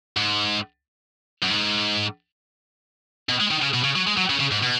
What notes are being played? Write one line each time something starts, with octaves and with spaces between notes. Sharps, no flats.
G#2
F#2
G#2
B2
G#3
D#3
C#3
B2
C#3
F#3
G#3
F#3
C#3
C#3
G#2
B2